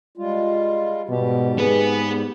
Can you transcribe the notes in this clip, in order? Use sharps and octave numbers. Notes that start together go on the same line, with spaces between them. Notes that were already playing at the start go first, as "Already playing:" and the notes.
G3 G#3 F4
G#2 B2 G3 G4
B3 G#4 B4